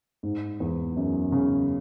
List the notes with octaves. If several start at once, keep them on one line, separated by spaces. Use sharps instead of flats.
G#2
E2
F#2
C#3